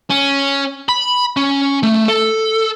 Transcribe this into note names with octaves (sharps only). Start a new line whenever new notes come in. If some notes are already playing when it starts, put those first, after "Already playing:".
C#4
B5
C#4
A3
A4